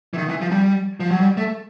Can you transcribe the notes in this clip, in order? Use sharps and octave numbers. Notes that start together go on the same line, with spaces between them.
E3
D#3
E3
F3
G3
F3
F#3
G3
A3